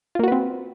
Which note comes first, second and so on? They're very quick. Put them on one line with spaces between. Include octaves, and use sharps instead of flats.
F4 A#3 F#4 B4 C4